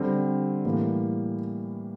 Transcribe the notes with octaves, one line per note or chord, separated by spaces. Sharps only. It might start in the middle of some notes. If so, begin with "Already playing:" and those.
Already playing: D3 G3 C4
A2 E3 G3 A#3